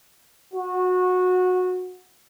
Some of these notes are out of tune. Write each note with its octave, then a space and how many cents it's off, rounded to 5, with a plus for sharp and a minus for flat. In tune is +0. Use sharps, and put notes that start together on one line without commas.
F#4 -20